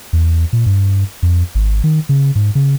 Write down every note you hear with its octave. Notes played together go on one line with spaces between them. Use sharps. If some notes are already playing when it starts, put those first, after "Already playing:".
E2
A#2
G2
F2
G#1
D#3
C#3
G#2
C#3